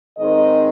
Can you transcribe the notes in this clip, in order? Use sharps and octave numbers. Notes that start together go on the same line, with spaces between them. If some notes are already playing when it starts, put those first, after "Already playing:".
G#2 D#3 G#3 C4 D#5